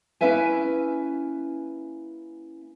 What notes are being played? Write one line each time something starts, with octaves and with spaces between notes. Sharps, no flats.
A#3 C#4 E4 B4 E5 G#5